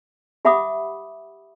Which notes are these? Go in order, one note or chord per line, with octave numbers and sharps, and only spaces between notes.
G4 E5 F#5 B5 D6 D#6